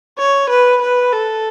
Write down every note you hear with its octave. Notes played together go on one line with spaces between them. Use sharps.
C#5
B4
B4
A4